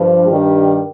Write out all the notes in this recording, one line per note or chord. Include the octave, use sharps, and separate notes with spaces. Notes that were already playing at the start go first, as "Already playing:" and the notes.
Already playing: G2 F3
G2 D#3 G3